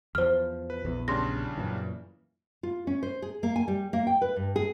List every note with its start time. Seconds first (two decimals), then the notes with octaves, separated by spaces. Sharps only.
0.15 E2 F3 C5 F6
0.70 B4
0.85 A#1 E2
1.08 C#3 G3 D4 C6 A#6
1.57 F#2 A#2 E3
2.63 F4
2.87 C#4
3.03 C5
3.22 G#4
3.43 A#3
3.56 G#5
3.68 G3
3.93 A#3
4.07 G5
4.22 B4
4.36 G2
4.56 G#4